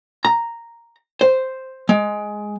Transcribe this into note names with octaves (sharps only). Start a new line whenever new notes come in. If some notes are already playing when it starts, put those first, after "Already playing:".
A#5
C5
G#3